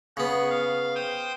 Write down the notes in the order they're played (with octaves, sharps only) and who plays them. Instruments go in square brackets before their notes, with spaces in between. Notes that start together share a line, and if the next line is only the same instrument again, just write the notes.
[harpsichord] C#3 B3 [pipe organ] G#4 F#5
[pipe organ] F5
C5 G5 D#6